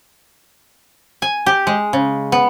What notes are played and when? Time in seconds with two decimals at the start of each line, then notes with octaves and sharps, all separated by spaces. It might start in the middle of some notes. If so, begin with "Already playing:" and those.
1.22 G#5
1.46 G4
1.67 G#3
1.93 C#3
2.32 B3